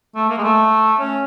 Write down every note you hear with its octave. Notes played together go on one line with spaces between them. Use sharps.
A3
A#3
G#3
A3
C#4